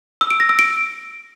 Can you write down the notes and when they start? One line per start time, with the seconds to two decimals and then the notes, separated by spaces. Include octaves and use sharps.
0.21 E6
0.30 D7
0.40 A#6
0.49 E6
0.59 D7